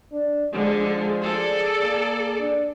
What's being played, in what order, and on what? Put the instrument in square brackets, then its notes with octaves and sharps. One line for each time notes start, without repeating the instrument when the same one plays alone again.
[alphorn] D4
[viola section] D3 G#3 [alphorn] F3
[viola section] G#4 A4 D5
[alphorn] A#3
D4